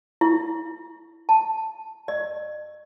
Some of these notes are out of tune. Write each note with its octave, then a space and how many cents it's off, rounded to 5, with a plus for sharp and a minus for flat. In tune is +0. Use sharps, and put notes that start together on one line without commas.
E4 +0
A5 +0
D#5 -45